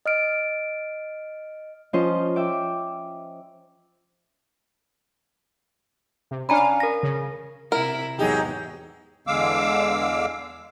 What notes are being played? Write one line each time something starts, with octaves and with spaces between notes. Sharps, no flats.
D#5 F6 D7
F3 C#4 F4 C5 D#5
E5 G5 D6
C3
C#4 D4 F5 G#5 A#5 B5
A#4 A#6
C#3
C3 E4 A#4
E2 G#2 F#3 D#4 G4 G#4
E2 D3 G#3 F5 D6 E6